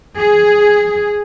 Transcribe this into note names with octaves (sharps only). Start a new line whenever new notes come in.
G#4